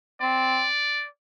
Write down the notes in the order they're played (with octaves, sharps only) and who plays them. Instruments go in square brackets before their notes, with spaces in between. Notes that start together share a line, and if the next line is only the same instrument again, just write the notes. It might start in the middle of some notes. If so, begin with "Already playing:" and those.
[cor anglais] C4 [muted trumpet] D5